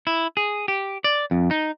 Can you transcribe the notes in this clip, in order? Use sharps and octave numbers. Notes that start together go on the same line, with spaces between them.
E4
G#4
G4
D5
F2
D#4